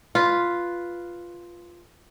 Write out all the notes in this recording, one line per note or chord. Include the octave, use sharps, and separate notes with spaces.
F4 B4